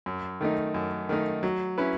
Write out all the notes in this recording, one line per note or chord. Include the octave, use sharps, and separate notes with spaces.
F#2
D#3 A3 D#4
F#2
D#3 A3 D#4
F#3
C#4 E4 B4